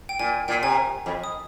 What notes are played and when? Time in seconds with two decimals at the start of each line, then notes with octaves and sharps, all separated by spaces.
0.09 G5
0.19 A#2 G#5
0.48 A#2 G5
0.62 C3 G#5
1.06 F2
1.24 D#6